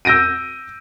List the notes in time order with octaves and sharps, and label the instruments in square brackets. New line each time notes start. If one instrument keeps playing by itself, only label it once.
[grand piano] E6 G6 A#6 D7 D#7